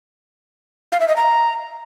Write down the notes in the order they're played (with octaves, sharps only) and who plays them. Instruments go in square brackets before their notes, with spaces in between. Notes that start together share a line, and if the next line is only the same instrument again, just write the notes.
[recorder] F5
E5
D#5
A#5